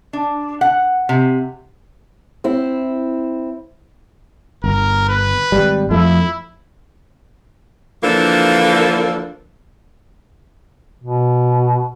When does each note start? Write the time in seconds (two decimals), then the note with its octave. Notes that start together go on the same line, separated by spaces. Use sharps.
0.13 D4
0.61 F#5
1.09 C3
2.44 C4 E4
4.64 G1 A#4
5.08 B4
5.52 G#1 G3
5.91 F2 F3 A3 E4
8.03 D3 E3 F3 A#3 D4 A4
11.04 B2